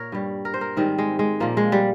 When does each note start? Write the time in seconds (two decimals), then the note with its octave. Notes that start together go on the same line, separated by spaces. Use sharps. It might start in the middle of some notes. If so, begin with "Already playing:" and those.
Already playing: A#2 A#4 C#5
0.12 G2 G3
0.45 A#4
0.54 C5
0.61 A#4
0.77 G#2 D#3 G3 C4
0.98 G#3
1.19 G#3
1.40 A#2 F3 A#3
1.57 G#3
1.72 G3